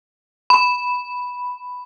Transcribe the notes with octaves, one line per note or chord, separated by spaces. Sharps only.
B5